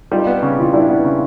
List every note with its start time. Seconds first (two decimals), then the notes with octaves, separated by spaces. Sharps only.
0.11 G3 D#4 F4
0.27 B3
0.43 C#3
0.58 E3 F4
0.73 G3 D4 E4
0.89 B3
1.05 C#3